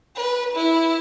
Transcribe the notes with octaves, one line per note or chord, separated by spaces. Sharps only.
B4
E4